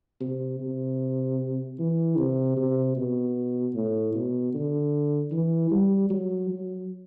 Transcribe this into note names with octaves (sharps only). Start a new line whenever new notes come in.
C3
C3
E3
C3
C3
B2
A2
B2
D3
E3
G3
F#3
F#3